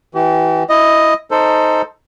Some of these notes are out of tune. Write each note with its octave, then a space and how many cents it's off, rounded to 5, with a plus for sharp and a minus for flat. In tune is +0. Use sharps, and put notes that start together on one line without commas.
E3 -15 G4 -40
E4 +0 D#5 +0
D#4 +5 A4 +15 C5 +0